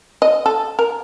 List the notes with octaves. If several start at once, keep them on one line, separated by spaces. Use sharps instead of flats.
D#5
A4
A#4